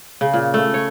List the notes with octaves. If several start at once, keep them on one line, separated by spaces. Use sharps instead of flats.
C#3
A#2
A3
C#5